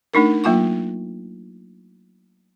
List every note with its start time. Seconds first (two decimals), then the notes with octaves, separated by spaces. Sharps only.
0.14 A3 D4 D#4 A#4
0.44 F#3 A#3 F4 F#5 C#6